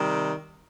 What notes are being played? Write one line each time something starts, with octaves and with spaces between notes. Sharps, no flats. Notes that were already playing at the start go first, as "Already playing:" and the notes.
Already playing: C3 D#3 G3